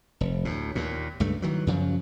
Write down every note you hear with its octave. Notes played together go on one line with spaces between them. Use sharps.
F1
D2 A2
D#2 A#2
C#2 G2 A3
D#3 E3 F#3
F#2 C#3 F3 F#3